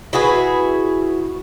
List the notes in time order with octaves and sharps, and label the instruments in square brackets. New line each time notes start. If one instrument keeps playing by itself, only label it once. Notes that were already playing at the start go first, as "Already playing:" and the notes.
[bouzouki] E4 F#4 G#4 B4